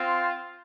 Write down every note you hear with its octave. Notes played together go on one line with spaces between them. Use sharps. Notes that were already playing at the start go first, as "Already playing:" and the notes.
Already playing: C4 F4